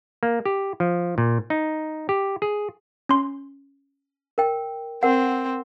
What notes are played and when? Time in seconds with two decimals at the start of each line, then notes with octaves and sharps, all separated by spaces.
0.23 A#3
0.45 G4
0.80 F3
1.18 A#2
1.50 D#4
2.09 G4
2.42 G#4
3.09 C#4 C6
4.38 A#4 G5
5.03 C4 A#4 F#5